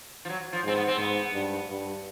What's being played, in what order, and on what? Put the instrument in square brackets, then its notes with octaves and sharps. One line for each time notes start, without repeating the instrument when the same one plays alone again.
[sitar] F3
F#3
F3
[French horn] G#2 [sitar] C4
[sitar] B3
C4
[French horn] G#2 [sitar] B3
[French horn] G2
G2